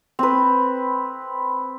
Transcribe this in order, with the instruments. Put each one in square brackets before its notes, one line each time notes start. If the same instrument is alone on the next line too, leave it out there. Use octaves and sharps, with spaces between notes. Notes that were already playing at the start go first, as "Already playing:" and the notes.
[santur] C4 B4